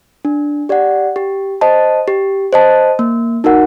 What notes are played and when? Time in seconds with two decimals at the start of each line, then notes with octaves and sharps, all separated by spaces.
0.25 D4
0.69 G4 D5 F#5
1.16 G4
1.61 C5 D#5 A5
2.08 G4
2.53 C5 D#5 A5
2.99 A#3
3.44 D#4 F#4 A#4 F#5